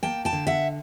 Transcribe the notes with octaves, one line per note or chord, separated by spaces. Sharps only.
A#3 G5 A5
G5 A5
D3
E5 F#5